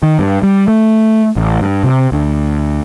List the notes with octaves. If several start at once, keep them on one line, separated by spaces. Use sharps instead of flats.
D#3
G2
G3
A3
A1
G2
C3
D2